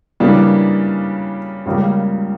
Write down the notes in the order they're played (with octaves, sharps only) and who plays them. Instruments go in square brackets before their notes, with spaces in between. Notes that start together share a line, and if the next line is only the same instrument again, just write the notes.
[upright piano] C#3 E3 G3 A#3 D4
C#2 C#3 G3 A#3